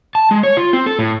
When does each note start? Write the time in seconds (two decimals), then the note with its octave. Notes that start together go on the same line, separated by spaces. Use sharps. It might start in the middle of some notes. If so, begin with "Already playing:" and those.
0.15 A5
0.31 G#3
0.43 C#5
0.57 F4
0.73 C4
0.86 A4
0.99 A2